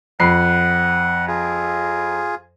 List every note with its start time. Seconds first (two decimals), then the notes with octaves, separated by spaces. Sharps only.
0.20 F2 F#5 B5 C7
1.28 F4 G#4